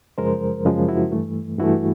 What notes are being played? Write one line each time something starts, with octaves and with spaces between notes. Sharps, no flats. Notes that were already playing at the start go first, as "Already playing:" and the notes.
F#2 C#3 F3 G#3 A#4 C5
F#2 C#3 F3 G#3
E4 F#4
G2 E3 A3
G2 E3 A3 E4 F#4